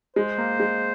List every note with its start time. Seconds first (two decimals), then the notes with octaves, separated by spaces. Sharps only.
0.16 G#3 C5
0.38 A#3
0.59 G#3